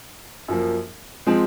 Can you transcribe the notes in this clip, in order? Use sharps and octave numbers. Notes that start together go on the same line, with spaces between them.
F#2 F3 A#3
F3 G#3 C4